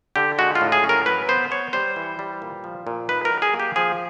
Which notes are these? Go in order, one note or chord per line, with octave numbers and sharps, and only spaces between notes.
D3 G4
G#3 F#4
F4
A2
G#4
C#4
A#4
F#3 B4
B3 C5
B3 C#5
G3 C5
E3
G3
A#2
F3
A#2
D#4 B4
A#4
F#3
G#4
A#3
G4
F3 G#4